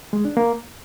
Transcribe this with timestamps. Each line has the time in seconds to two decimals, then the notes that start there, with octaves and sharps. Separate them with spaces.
0.13 G#3
0.25 D4
0.37 A#3